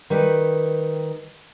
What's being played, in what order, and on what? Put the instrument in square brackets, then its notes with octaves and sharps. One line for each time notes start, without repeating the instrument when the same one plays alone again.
[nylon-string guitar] D#3 G3 B4 G5